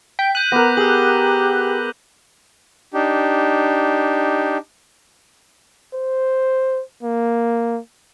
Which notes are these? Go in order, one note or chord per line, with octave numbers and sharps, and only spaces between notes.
G5 B6
F#6 G6 D#7
B3 A#4 D6 A#6
G4 G#4 E6 F#7
D4 D#4 G4
C5
A#3